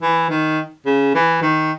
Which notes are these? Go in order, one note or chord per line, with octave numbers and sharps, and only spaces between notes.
E3
D#3
C#3
E3
D#3